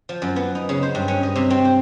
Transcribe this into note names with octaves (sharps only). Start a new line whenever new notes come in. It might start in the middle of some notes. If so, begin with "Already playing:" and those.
F3
F#2
B3
D#4
C#3
C5
G2
C#4
D#5
C3
C4
C5